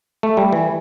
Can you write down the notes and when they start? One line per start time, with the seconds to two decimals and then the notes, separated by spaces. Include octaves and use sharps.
0.23 A3
0.37 G3
0.53 E3